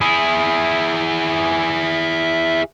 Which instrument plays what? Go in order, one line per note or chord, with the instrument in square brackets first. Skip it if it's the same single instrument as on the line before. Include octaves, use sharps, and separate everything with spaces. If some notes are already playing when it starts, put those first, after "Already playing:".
[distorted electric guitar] E4 G#4